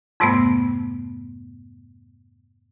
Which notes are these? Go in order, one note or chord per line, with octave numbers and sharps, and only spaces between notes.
F2 G#2 C3 G3 A3 B3